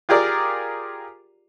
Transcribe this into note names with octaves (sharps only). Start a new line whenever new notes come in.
F4 G4 G#4 A#4 D5